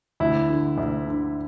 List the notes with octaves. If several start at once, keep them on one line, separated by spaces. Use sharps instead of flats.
D2 E4
D3
D2
D3